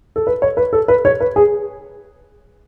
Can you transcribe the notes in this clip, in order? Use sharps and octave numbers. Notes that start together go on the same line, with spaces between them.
A4
B4
C#5
B4
A4
B4
C#5
B4
G#4